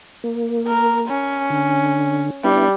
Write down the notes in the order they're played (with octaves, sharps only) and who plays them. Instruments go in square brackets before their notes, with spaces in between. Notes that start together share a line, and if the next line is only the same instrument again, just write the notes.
[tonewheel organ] A#3
[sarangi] A#4
C#4
[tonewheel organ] D3
[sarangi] G3 [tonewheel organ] B3 D4 E4